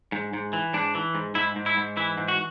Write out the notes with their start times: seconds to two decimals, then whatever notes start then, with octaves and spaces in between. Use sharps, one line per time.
0.12 G#2
0.33 G#2
0.53 E3
0.73 G#2 D4
0.95 E3
1.15 G#2
1.35 G#2 E4
1.56 G#2
1.66 E4
1.77 G#2
1.97 E3 E4
2.18 G#2
2.28 F#4